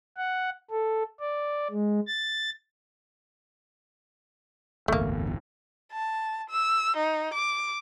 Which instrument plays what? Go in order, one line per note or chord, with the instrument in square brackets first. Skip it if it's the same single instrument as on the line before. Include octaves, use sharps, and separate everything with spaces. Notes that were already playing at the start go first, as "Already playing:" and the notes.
[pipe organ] F#5
A4
D5
G#3
A6
[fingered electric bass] D1 G1 E2 [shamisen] A3 A#3
[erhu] A5
E6
D#4
D6